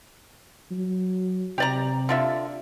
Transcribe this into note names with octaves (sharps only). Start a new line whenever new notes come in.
F#3
C3 G4 D5 A#5
D3 F4 E5